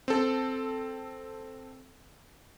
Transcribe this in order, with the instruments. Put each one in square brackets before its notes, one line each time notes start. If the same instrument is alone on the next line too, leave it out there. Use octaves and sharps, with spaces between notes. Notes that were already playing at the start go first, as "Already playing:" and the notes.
[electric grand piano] C4 A4